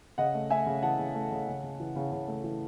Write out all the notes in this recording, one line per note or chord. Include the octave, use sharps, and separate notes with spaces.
C#3 D#5 F#5
A3
A3 E5 G#5
C#3
E3 F#5 A5
C#3
A3
C#3
C#3
C#3
E3
C#3
C#3
A3
E3